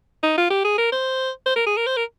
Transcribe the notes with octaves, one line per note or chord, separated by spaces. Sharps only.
D#4
F4
G4
G#4
A#4
C5
C5
A#4
G#4
A#4
C5
A#4